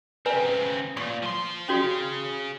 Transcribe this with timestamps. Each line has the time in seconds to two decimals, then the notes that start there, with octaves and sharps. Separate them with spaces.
0.26 C#3 C4 B4 G#5 A#5
0.97 A#2 C#6
1.23 F3 C6
1.69 C#4 F#4 G#4 C#5